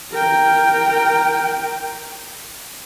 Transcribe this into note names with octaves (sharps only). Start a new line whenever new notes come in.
A#4 G5